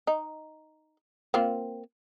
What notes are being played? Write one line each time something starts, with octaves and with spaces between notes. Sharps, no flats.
D#4
A#3 C4 F4